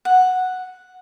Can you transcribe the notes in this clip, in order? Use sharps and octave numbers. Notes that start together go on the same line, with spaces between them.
F#5